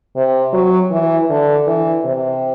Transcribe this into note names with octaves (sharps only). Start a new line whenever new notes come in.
C3
F#3
E3
D3
E3
C3